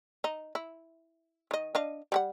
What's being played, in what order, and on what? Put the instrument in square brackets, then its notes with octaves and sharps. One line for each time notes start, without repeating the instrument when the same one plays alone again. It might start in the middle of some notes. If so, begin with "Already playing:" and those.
[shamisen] D#4
E4
D#3 D#5
D4 D#5 F5
G3 G4 F#5